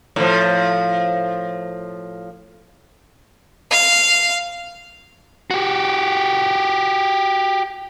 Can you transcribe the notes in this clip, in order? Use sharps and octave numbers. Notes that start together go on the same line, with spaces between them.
A2 F3
F5
F#4 G4